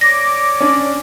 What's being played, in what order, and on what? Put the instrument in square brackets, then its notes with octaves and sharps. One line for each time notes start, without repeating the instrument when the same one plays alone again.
[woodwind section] C#5 D5 D6 [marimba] A#6
[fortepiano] C#4 D4